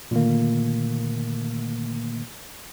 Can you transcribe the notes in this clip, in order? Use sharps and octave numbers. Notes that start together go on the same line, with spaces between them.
A#2 D3 D#3 A3 A#3